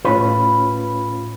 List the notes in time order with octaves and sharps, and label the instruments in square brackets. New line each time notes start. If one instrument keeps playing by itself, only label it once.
[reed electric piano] A2 C#4 F4 [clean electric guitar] B4